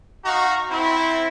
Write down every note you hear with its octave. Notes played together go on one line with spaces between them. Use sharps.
D#4 F#4 F5 A#5 C#6
C4 E4